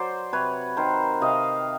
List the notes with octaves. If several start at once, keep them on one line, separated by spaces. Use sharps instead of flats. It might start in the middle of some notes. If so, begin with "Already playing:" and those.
Already playing: F#3 C5 D5
C3 B4 C#5
D#3 A#4 C5
C3 D#5 F5